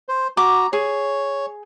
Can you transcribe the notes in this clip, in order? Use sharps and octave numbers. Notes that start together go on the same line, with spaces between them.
C5
F#4 A#5 D6
G#4 C#5